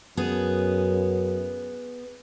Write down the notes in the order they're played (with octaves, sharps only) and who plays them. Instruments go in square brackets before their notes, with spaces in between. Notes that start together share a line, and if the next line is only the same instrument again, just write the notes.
[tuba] F#2 [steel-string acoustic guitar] B3 G#4